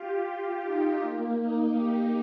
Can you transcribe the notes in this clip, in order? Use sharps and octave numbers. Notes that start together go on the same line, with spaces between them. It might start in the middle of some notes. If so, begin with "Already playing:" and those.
Already playing: F4 G4
F4
D#4
A#3
D#4
G4